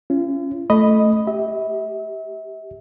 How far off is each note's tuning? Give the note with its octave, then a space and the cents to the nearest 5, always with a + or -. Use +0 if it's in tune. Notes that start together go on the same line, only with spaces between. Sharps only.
C#4 +0 F4 -45
A3 -5 D#5 +0 B5 +0
G4 +0 E5 -35